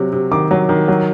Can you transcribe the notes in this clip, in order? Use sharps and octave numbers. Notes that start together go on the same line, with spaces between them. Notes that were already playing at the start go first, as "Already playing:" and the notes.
Already playing: C3 F#3
C3
D#3 D6
F#3
D#3
F#3